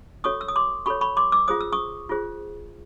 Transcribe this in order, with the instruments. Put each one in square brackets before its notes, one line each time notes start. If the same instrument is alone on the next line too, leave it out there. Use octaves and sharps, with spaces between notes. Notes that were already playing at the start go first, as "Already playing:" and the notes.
[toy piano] F#4 A4 C#5 C#6 D#6
E6
D#6
C6 D6
F#4 A4 C#5 B5 C#6
B5 C#6
C6 D6
D6 E6
F4 G#4 C5 D#6
E6
C#6 D#6
F4 G#4 C5